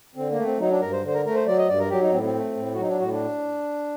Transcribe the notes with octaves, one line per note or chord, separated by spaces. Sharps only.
D3 C4
A#3
A3
C4
F#3 D#4
D4
G2 A#4
C5
D3 C5
A#4
A3 A#4
C5
F#3 D5
D#5
G2 D5
A#4
F#3 G4
D#4
A2 C4
C4
A3
A2
F#4
F#3 D#4
D4
A2 F#4
D4